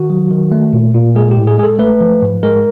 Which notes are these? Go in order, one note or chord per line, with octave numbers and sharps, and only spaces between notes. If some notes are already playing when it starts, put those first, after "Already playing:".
Already playing: D#3 F#4
F#3
D#3
A3
A#2
A#2
G#3 G#4
G4
A2
G#4
G#3 G#4
A4
A3 B4
F3
G#2
G#3 A#4